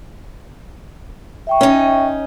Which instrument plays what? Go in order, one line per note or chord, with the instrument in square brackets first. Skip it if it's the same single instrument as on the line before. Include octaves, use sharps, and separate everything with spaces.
[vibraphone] E5 G5 C#6
[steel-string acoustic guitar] C#4 D#4